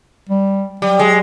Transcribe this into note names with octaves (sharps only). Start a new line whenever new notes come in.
G3
F#3 G3
G#3